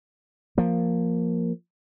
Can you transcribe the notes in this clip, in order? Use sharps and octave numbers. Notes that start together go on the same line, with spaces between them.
F3 A#3